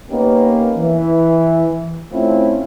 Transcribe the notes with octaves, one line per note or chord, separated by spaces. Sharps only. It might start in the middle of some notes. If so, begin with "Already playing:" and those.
A#3 B3 C#4 D#4 G4 B4
E3
A3 C4 C#4 E4 F4